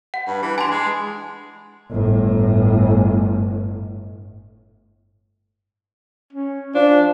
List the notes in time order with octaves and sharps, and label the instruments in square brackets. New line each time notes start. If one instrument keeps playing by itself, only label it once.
[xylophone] F#5
[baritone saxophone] G2
E3
[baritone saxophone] D4 [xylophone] G#5 C6
[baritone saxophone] G#3
[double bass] G1 A2
[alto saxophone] C#4
[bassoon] F3 [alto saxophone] D4